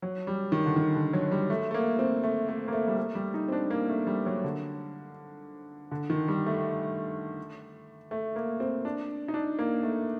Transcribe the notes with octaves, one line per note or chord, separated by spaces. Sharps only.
F#3
G3
D#3
D3
D#3
D3
F#3
G3
A3
A3
A#3
C4
A3
A3
A#3
A3
G3
A3
G3
D#4
C4
D4
A#3
A3
G3
F#3
D3
D3
D#3
G3
A3
A3
A#3
C4
D4
D#4
D4
A#3
A3